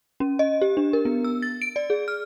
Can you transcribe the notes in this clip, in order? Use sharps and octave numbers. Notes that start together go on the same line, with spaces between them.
C#4
D#5
G4
D4
A#4
B3
E6
A6
D7
D5
G#4
F6